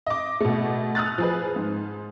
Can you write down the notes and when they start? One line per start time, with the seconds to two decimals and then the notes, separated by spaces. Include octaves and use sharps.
0.07 D#5 D6
0.40 B2 A3
0.95 D#6 F6 F#6 A6
1.18 F3 G#4 B4
1.56 G#2